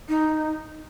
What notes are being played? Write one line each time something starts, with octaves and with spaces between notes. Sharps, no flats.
D#4